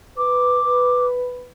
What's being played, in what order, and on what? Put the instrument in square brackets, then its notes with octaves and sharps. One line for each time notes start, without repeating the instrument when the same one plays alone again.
[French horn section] B4 [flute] D6